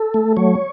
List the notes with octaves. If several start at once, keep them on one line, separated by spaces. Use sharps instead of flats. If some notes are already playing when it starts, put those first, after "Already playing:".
Already playing: A4
A3
F#3 C#5